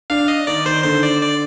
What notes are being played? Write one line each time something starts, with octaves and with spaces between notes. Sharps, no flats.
D4 F5
D#5
D#3 D5
D#3 C5
D3 C5
D5
D5